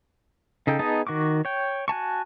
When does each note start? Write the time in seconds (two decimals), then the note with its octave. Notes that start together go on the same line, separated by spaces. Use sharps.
0.67 C#3 D#4 A4 G5
0.79 B3 D#4 G#4 D#5 A5
1.07 D#3 F#4 C#6 D6
1.45 C#5 G5
1.88 F#4 G#5 A5 C#6